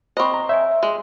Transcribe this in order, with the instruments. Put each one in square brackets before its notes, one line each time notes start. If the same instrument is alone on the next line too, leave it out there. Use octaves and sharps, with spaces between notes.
[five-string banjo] C4 D#5 [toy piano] C5 B5 C#6
[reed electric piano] A#5
[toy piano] C#5 D5 G#5 [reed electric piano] E5
[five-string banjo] G#3 [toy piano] C6